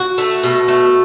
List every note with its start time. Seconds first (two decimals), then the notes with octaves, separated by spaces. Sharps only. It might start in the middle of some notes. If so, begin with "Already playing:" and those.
Already playing: F#4
0.18 A3
0.43 B2
0.68 A3